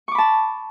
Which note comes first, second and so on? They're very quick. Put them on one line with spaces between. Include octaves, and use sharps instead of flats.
C#6 D6 B5 A5